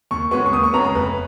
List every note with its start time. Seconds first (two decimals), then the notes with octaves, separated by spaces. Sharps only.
0.11 D#2 C#6
0.31 C#3 G#3 B3 C#6
0.46 C#6
0.52 D#2 D#6
0.63 C#6
0.73 C#3 G#3 B3 A#5
0.84 A#5
0.95 F1 B4